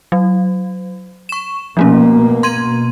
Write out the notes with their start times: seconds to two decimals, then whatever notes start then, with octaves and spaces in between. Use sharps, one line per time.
0.12 F#3
1.29 C#6 E7
1.77 B2 F3 A3 A#3 C#4
2.43 C6 G#6 D#7